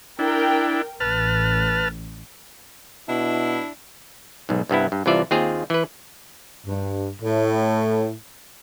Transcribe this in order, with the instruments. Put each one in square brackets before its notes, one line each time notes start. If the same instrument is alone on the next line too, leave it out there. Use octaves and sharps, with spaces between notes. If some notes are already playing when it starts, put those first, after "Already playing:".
[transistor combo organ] D4 E4 [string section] A#4 G5
[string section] A1 [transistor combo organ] B4 A5 F6
[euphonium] B2 [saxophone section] D4 E4
[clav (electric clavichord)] B1 G#2
C2 G2 B3 E4
G2
C2 C3 E3 F4 D5 E5
D#2 C4 F4 G#4 F5
E3 B4
[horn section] G2
A2